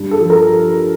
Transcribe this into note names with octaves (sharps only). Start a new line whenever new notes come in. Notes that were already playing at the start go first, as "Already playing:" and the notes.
Already playing: G2
A4
F3
A#4